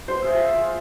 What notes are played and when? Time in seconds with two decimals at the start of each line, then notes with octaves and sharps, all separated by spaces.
0.08 C5
0.22 F4 G#4 E5